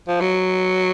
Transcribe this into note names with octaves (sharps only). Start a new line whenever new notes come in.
F3
F#3